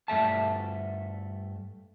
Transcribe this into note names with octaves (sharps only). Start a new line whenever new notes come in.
G2 A3 E5 A5